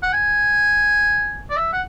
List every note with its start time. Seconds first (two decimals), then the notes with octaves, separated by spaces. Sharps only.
0.03 F#5
0.13 G#5
1.50 D5
1.57 E5
1.73 F#5